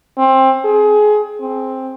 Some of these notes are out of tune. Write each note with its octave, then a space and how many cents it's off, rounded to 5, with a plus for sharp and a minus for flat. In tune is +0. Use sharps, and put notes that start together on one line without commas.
C4 +20
G#4 +25
C4 +5